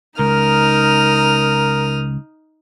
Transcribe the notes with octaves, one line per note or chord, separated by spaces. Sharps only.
C#2 D#4 A#4 D#6 F6